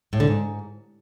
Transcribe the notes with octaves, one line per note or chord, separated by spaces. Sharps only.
A2
D3
G#2